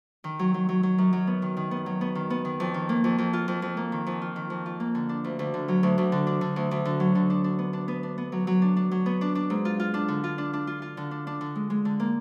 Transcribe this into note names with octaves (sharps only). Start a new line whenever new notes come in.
D#3
F#3
F#3
F#3
F#3
F#2
F#3
B3
D#3
D#3
B3
F#3
B3
D#3
B3
D#3
F2
D#3
A#3
F2
F2
F4
F2
F2
A#3
D#3
F2
F4
D#3
F2
F4
A#3
D3
D4
D2
D2
D3
F#3
D2
D2
D3
D4
D3
D2
D2
D3
F#3
D3
D4
D4
B3
D4
B3
D4
B3
F#3
F#3
D4
D4
F#3
B3
D4
D4
G#2
F4
F4
D4
D3
F4
D4
D4
F4
F4
D3
D4
D4
D3
G#3
G#3
D3
A#3